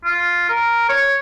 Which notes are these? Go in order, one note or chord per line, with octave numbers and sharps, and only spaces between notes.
F4
A#4
C#5